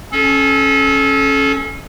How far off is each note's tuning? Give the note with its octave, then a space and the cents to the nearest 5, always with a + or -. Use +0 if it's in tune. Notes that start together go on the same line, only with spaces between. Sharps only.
C#4 -10 A4 -30